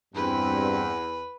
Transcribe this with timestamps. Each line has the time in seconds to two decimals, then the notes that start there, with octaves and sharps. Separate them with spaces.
0.15 E2 G2 C4 B4